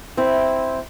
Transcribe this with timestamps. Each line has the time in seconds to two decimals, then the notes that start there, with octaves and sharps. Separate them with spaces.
0.17 C4 E4